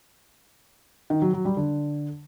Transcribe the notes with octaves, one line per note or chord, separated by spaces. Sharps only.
D#3
F#3
F#3
G3
D3